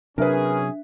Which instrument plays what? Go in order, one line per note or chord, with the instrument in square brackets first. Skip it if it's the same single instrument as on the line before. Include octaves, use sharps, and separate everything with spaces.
[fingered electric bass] C3 F#3 [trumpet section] C#4 G#4 [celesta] D4 E5 [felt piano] A#4 B4